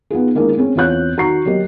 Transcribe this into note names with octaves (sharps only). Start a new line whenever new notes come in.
B3 D#4 F4 G#4
D#3 G#3 A#3 D4 E4
C4 C#4 G#4
E2 C4 F4 C#5 F#6 G6
D#3 F#4 A#5 C#6 C7
F#3 A#3 G4 D#5